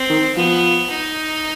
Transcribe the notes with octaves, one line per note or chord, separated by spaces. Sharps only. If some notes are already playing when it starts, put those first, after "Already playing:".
Already playing: C4
D#3
F3 B3
D#4